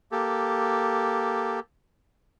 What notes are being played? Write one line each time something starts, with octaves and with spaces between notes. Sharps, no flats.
A#3 G4 A4